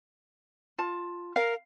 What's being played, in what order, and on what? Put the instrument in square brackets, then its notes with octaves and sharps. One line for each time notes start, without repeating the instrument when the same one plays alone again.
[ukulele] F4 A5
[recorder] A#4 [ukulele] F5